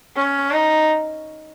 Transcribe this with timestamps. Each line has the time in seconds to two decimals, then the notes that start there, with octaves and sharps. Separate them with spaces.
0.16 C#4
0.51 D#4